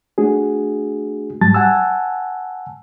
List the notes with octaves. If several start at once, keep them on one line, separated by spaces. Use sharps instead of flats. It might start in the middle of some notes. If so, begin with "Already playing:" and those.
A3 D4 F#4 G#4
G#2 F#3 G3 A5 A6
F#5 G#5 A5 E6